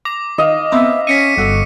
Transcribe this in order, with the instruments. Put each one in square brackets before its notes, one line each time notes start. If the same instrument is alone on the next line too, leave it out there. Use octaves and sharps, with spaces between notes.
[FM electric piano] A#5 [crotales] D6
[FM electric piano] D#3 [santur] D#5 F5
[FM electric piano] B3 C4 A#4 [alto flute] E5
[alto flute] C#4 [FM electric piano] C#6 A#6 [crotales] B6 C#7 D#7
[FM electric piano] G1 F#4 [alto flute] A4